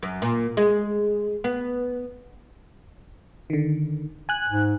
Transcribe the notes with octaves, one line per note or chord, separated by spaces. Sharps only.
F#2
A#2
G#3
B3
D3 D#3
G#5 F#6
G#2